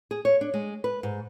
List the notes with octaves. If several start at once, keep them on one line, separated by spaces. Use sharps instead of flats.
G#4
C#5
D4
G#3
B4
G#2